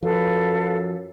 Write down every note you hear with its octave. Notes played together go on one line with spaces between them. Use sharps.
F#2 F3 A4 B4 F5